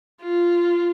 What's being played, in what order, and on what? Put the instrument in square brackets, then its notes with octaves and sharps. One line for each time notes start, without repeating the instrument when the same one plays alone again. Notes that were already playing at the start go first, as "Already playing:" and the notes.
[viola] F4